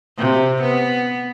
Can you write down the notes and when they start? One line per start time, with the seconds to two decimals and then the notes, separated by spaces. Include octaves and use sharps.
0.18 C3
0.62 B3